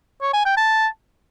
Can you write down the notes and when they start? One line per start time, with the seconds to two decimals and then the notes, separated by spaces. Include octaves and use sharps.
0.22 C#5
0.33 G#5
0.45 G5
0.57 A5